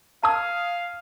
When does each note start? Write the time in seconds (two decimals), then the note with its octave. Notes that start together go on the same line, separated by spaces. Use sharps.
0.23 F5 A5 D#6 G#6 D#7